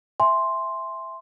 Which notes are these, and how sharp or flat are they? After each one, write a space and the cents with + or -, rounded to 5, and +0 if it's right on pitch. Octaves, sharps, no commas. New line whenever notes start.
E5 +0 G#5 +0 C6 +0